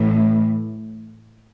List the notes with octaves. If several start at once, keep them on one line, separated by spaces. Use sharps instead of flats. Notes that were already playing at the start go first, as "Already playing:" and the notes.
Already playing: A2 E3